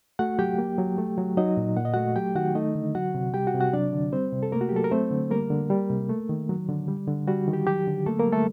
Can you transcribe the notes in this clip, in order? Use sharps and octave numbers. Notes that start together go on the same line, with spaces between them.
A3 F#4 F#5
F#3 G4 G5
A#3
F#3
A3
F#3
F#3 D#4 D#5
A#2
A#2 F#5
D#5
A3 F#4 F#5
F#3 G4 G5
D#3 F#4 F#5
A3 D#4 D#5
D3
F#3 F#4 F#5
C3
G3 G4 G5
F#4 F#5
C3
F#4 F#5
F#3 D4 D5
D3
G3 C4 C5
C3
A4
A3 A#3 A#4
F#4
G4
F#3 A4
A#4
A3 C4 C5
D3
G3 A#3 A#4
D3
G3
C3
A3
D#3
F#3
D3
G3
D3
G3 F#4
D#3
G4
F#3 G4
D3
A3 A#3 A4
A#3 A#4
G3
A3 A4